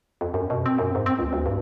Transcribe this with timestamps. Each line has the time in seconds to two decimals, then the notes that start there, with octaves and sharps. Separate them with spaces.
0.21 F2
0.34 F#2
0.50 B2
0.66 C4
0.78 F#2
0.95 G#2
1.06 C4
1.19 C#2
1.33 D2
1.46 G2